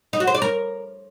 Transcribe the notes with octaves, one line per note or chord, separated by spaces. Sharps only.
D#4
F#4
C5
D5
A#4